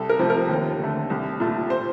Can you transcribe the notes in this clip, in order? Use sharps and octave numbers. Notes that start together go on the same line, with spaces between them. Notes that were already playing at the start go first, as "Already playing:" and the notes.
Already playing: C2 A4
A#4
C3 F3 A3
A#4
D#2
D3 A3
C2
A#2 A3
C5